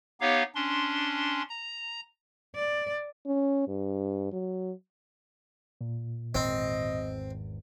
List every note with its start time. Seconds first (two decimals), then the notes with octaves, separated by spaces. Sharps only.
0.21 B3 D#4 G4 C#5 F5
0.55 C#4 D4 C6
1.49 A#5
2.55 D5
3.26 C#4
3.68 G2
4.32 F#3
5.81 A#2
6.35 G#1 E2 C4 D#5